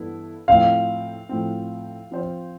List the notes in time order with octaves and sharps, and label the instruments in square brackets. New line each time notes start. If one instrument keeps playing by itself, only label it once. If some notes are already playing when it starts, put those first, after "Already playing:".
Already playing: [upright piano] G2 E3 B3 E4 A4
[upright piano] A2 F3 C4 [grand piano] F5
[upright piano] A2 F3 C4
F3 C4 F4 C5